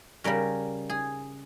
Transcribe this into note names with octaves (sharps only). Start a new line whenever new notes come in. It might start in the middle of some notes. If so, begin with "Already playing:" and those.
C#3 G3 C#4 A#4
G#4